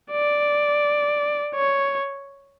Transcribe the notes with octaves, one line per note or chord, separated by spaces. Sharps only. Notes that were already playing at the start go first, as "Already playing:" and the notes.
D5
C#5